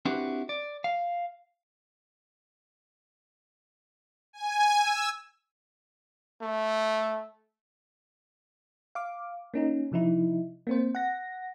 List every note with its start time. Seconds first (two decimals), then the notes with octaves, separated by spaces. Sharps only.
0.05 C4 D4 E4 F#4 G4 B4
0.49 D5
0.84 F5
4.33 G#5
4.79 E6
6.42 A3
8.95 F5 D6
9.54 A#3 C#4 D#4
9.92 C3 F3 D#4 E4
10.67 A#3 C4 C5
10.95 F#5 A#6